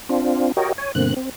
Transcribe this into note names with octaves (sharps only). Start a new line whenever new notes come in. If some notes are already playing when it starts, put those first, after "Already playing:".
C4 D4 F4
F#4 G4 A#4 C#5 D#5 G5
C#5 G#5
G2 B2 D3 A#3 C4 F#6
C4